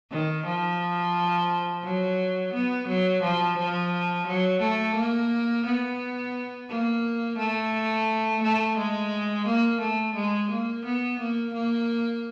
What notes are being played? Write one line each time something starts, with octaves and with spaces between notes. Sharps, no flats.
D#3
F3
F#3
B3
F#3
F3
F3
F#3
A3
A#3
B3
A#3
A3
A3
G#3
A#3
A3
G#3
A#3
B3
A#3
A#3